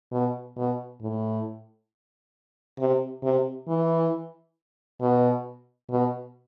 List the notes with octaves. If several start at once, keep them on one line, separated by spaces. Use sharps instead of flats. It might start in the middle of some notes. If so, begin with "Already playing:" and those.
B2
B2
A2
C3
C3
E3
B2
B2